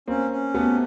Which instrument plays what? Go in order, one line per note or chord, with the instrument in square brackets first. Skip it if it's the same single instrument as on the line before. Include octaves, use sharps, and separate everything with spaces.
[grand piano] A#3 C4 [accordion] C#4
[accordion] C#4
[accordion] C3 [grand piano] A3 B3